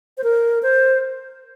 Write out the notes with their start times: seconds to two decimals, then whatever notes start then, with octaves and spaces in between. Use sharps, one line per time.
0.18 C5
0.24 A#4
0.63 C5